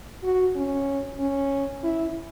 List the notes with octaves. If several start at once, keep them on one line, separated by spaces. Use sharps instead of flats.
F#4
C#4
C#4
E4